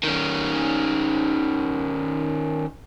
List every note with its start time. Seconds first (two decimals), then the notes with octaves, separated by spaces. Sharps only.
0.03 D#3 C#4